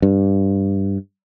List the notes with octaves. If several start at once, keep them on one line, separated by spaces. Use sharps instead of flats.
G2